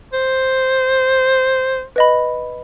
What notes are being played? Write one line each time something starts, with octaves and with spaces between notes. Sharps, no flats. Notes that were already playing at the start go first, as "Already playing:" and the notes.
C5
B4 D#5 B5